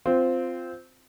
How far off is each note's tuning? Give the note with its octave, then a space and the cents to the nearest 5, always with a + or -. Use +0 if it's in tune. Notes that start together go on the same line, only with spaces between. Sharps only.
C4 -10 F4 +0